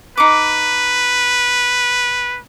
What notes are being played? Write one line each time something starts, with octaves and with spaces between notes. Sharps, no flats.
D#4 B4 D6